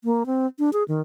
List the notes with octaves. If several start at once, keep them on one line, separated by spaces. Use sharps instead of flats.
A#3
C4
D4
G#4
D#3